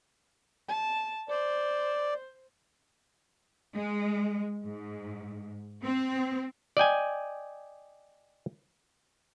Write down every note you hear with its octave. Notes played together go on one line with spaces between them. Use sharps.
A5
C5 D5
G#3
G#2
C4
D5 D#5 G5 G#5